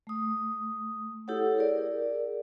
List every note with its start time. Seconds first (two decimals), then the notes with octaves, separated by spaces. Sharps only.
0.07 A3 D#6
1.28 E4 G4 A4 C#5 F#5
1.57 G#4 A#4 D5